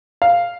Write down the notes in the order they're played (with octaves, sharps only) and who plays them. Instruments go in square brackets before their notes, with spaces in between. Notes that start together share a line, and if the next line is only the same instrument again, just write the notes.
[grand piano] F5